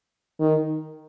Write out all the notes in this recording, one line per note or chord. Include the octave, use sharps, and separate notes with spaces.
D#3